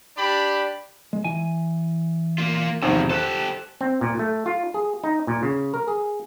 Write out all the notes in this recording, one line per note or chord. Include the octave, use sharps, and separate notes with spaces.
D4 G4 D5 B5
G#3
E3 G#5
A#3 F4
G#1 E2 C3 F3 C5
G4 A4 C5 F#6
C4
A#2
A3
F4
G#4
D#4
A#2
C#3
A#4
G#4